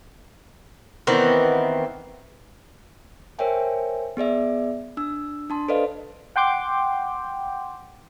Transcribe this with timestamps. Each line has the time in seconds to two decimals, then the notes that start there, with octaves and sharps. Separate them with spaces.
1.07 D#3 E3 B3 C4
3.39 A#4 C5 C#5 E5 G5 G#5
4.17 B3 G#4 D5 E5
4.97 D4 E6
5.50 D4 A5 C6
5.69 A4 B4 C5 D5 D#5 F5
6.36 F#5 G5 C6 D6 G6